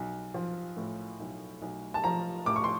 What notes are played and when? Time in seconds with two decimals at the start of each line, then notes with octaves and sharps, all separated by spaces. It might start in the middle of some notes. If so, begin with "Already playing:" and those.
Already playing: B1
0.34 F3
0.77 A2
1.20 B1
1.62 B1
1.94 A5
2.04 F3 A#5
2.46 A2 D6
2.56 C#6
2.64 C6